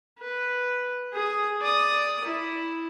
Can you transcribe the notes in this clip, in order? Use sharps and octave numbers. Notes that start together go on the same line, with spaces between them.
B4
G#4 D#6
D5 D#6
E4